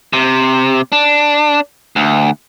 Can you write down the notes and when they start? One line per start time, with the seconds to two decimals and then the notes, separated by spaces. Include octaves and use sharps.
0.13 C3
0.92 D4
1.96 D2